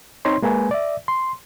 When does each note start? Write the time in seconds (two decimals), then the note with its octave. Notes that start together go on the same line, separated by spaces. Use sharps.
0.25 C4 D#4 C#5 C6
0.42 G#3 A#3 B4 G#5
0.71 D5 E5
1.08 C6